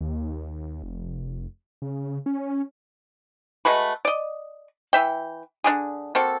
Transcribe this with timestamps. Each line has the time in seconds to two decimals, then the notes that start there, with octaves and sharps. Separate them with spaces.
0.01 D#2
0.83 F1
1.82 C#3
2.26 C#4
3.65 G#3 A3 F#4 B4
4.05 D5 D#5
4.93 E3 E5 G5
5.64 D3 D4 G4 G#4
6.15 A#3 C4 F#4 A4